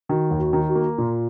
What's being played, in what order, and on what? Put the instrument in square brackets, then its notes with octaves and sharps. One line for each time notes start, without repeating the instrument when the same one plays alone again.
[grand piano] D#3 [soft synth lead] F#4
[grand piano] D#2
[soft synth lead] F#4
[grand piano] D#3
[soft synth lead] F#4
[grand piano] A#3
[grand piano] A#2 [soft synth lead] F4